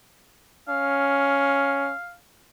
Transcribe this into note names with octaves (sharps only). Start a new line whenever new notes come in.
C#4 F5